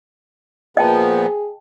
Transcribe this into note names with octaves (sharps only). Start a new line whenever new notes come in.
A#2 F3 B3 G#4 D#5 G5 A5